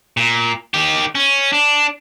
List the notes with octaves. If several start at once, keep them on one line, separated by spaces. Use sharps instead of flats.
A#2
D#3 G4
C#4
D4